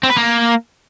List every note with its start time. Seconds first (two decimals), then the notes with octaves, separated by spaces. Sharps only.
0.03 C4
0.10 B4
0.16 A#3